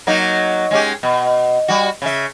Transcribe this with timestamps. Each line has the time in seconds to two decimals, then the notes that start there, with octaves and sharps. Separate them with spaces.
0.07 F#3 A#3 D#4
0.71 G#3 C#4 G4
1.03 B2
1.68 G3 F#4
2.02 C#3 E5